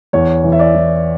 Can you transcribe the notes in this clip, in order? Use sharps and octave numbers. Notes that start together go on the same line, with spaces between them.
E2 C#5
E3
E5
D5
E3